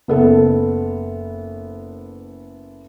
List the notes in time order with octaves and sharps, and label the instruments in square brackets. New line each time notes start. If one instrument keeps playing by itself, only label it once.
[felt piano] F#1 B3 A4